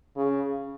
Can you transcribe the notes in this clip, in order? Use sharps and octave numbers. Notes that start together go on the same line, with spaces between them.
C#3